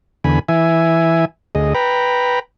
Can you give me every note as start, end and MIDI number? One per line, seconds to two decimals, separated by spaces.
0.24 0.39 40
0.24 0.39 50
0.24 0.39 80
0.24 0.39 83
0.49 1.25 52
0.49 1.25 76
0.49 1.25 80
1.55 1.74 38
1.55 1.74 68
1.55 1.74 75
1.75 2.39 71
1.75 2.39 79
1.75 2.39 82
1.75 2.39 83